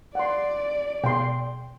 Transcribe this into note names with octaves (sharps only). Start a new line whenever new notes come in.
D5 F#5 C6
B2 G#3 G5 C6